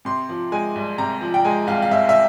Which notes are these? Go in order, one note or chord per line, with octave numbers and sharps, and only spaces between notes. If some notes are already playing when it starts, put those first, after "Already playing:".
C3 C6
F3
G#3 G#5
C2
C3 A#5
F3
G5
G#3 G#5
C2 F5
F5
C3 E5
E5